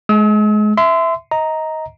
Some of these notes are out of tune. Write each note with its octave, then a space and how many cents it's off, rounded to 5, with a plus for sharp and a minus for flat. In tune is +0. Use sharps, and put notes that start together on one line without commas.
G#3 +30 E6 -45
E5 +0 C6 -30
D#5 +20 A#5 +0